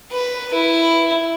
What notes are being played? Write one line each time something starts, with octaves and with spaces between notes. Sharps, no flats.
B4
E4